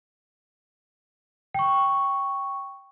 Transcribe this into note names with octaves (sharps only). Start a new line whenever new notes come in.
G5 C#6